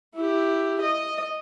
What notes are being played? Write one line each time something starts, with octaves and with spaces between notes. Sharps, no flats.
E4 G4
D#5